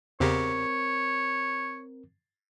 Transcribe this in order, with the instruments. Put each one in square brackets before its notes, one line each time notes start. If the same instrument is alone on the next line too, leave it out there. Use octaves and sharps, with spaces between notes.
[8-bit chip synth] E2 C#3 G4 [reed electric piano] C4 A#4 [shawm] C#5